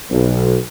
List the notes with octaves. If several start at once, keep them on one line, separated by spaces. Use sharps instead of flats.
B1